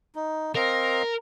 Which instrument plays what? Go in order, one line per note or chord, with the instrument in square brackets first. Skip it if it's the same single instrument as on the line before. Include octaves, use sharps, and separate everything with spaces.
[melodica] D#4
[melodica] C4 D#5 F5 [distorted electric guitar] A#4